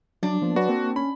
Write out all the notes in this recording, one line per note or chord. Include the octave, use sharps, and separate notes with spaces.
F#3 D4
F3 A#3 B3
F#3 F#4 B4 D5
A#3 C4
C#4 B5